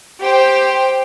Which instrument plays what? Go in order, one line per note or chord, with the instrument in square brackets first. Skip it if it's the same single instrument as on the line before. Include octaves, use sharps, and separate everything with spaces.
[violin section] G4 C5 G5